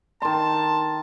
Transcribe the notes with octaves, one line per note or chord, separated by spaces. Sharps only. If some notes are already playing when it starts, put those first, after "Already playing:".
D#3 A5 C6